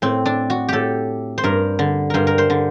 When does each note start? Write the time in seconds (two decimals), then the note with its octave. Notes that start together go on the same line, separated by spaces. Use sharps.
0.02 A2 C4
0.26 D4
0.50 F#4
0.69 A2 G4 A4
1.38 C5
1.44 G2 A#4
1.79 D3
2.10 G2 A#4 C5
2.27 A#4
2.38 C5
2.50 D3